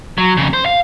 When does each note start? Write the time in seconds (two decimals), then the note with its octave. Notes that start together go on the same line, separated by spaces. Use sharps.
0.18 F#3
0.37 F2 C#3
0.53 C5
0.66 F5